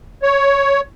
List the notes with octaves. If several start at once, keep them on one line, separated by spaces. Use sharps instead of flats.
C#5